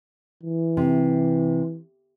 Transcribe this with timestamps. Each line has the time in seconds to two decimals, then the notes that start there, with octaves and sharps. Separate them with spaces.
0.43 E3
0.77 C3